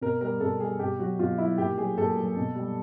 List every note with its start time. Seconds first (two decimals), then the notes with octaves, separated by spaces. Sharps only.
0.01 B2 A#4
0.21 G3 A#4
0.40 B2 A4
0.60 G3 G#4
0.79 B2 G4
0.99 F#3 F#4
1.19 B2 F4
1.38 F#3 E4
1.58 A#2 G4
1.77 F#3 G#4
1.97 A#2 A4
2.17 F#3
2.36 B2
2.55 G3